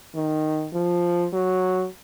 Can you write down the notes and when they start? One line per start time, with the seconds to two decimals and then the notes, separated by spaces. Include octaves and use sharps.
0.15 D#3
0.74 F3
1.33 F#3